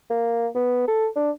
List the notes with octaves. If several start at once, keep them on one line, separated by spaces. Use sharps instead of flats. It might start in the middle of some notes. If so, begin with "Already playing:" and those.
A#3
B3
A4
D4